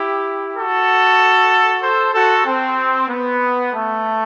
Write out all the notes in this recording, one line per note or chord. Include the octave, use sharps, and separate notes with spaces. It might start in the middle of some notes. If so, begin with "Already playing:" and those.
Already playing: E4 G4
F#4 A4
A4 C5
F#4 A4
C4
B3
A3